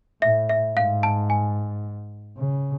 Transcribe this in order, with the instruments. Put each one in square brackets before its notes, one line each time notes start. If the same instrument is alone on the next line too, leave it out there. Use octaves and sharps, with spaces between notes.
[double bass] A2 [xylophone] E5
[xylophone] E5
[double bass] G#2 [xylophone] F5
[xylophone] A5
G#5
[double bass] C#3